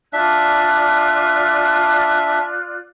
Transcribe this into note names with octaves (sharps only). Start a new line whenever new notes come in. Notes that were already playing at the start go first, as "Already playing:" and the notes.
D4 F4 D5 E5 F#6